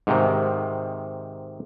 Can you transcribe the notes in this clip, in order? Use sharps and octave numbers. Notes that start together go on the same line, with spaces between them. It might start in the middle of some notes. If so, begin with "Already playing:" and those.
G#2 C3 D#3